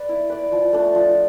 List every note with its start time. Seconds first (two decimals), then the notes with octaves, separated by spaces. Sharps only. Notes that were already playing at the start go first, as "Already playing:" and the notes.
Already playing: B4 D5
0.09 E4
0.29 B4 D5
0.52 F3
0.73 A3 D4
0.95 F3